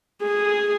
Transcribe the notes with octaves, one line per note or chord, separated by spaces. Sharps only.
G#4